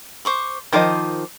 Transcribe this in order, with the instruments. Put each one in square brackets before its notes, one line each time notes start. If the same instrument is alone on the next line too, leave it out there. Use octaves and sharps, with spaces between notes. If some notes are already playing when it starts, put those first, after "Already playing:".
[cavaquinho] C5 C#6 D6
[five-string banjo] D#3 F3 D#5 [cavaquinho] C5 D6